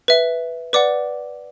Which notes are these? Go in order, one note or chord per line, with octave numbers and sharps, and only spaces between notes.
B4 E5
B4 D5 F#5 D6